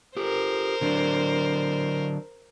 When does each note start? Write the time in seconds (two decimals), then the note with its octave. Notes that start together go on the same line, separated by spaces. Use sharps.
0.17 G4 A4 A#4 C5
0.81 D3 F#3 D4